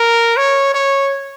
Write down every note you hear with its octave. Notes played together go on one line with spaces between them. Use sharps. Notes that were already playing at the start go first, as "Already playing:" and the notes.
Already playing: A#4
C#5
C#5